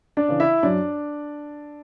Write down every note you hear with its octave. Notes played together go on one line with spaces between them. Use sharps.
D4 D5
C#3 E3
E4 E5
F#2 D4 D5